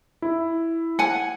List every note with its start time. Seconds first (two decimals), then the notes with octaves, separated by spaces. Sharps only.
0.22 E4
0.99 F#5 G#5